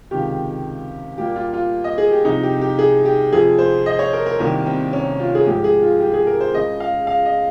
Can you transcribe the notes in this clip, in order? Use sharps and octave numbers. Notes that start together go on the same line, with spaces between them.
C#2 C3 D#3 G4
A#2 G3 A#3 G4
F4
F4
D#5
G#4
G4
C2 C3 F3 D#4
G4
G4
G#4
G4
F2 C3 F3 G#4
C5
D#5
C#5
A#4
A#4
C2 C3 D#3 G3 A#3 A#4
C4
C#4
F4
G#4
G#2 F3 G#3 G4
G#4
F4
G4
G#4
A#4
C5
C#2 C#3 G#3 D#5
F5
F5
D#5